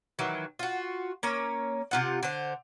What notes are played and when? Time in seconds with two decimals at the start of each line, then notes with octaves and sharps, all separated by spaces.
0.19 D#3 E3 F#3
0.59 F4 F#4
1.23 A#3 C#4 C#5
1.91 C3 F4 F#5
2.23 D3 C5